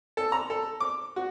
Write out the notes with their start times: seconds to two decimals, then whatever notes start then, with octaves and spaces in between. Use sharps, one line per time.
0.17 A4
0.32 A#5
0.50 A4
0.80 D6
1.16 F#4